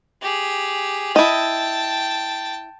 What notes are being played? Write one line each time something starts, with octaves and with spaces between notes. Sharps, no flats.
G4 G#4
E4 D#5 G5 A5